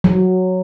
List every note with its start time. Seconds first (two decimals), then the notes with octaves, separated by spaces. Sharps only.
0.04 F#3